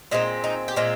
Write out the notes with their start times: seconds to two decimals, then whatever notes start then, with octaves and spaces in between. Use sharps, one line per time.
0.11 A#2 G#3 C4 D#4
0.44 D#4
0.68 G4
0.76 A#2 G#3 C4 F4